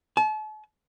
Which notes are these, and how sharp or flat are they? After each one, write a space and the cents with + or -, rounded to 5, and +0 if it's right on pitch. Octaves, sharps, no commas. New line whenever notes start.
A5 -40